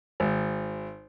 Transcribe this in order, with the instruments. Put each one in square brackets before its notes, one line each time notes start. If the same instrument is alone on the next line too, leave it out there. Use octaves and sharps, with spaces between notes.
[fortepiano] G#1